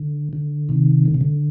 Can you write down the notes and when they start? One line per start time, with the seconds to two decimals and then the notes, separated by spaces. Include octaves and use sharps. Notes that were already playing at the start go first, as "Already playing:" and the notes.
Already playing: D3
0.33 D3
0.69 C3 D#3
1.06 D3
1.14 C3
1.21 D3